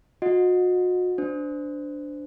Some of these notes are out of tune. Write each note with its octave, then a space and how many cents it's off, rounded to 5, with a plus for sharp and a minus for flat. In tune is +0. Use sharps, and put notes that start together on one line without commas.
F#4 -35 D#5 +0 F#5 -25
D4 +0 C5 -25